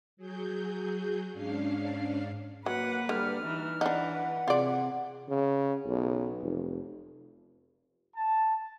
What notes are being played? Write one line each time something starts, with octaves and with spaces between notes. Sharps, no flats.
F#3 G#4 G6
G#2 C#4 D4 F5 C7
F#3 A#3 B4 F#5
D3 G3 F6
E3 D#4
E3 D4 D#4 B4 F#5
C3 F4 G#4 D5
C#3
B1
F1
A5